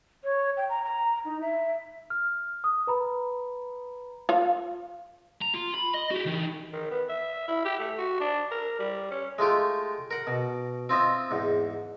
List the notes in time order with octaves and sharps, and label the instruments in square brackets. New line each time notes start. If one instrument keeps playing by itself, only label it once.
[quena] C#5
G5
A#5
A#5
D#4
E5
[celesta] F6
D#6
B4 A#5 B5
[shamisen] F4 F5
[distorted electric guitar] A#5
F4
B5
D#5
F#4 G4
E3 D#4
[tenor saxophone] D#3
B3
E5
E4
G4
A3
F#4
D4
A#4
G3
C#4
[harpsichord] G#3 A3 F4 G4
A#4 F#5
B2
C4 F4 D#5 E5
E2 G#2